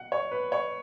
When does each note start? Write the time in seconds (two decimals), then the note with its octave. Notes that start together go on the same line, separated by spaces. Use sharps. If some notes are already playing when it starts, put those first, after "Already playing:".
Already playing: F#5
0.12 C#5
0.32 B4
0.52 C#5